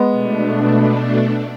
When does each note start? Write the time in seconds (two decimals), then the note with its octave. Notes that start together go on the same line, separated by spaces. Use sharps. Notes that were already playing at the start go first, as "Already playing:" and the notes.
Already playing: G#3 B3
0.11 B2 A3 D4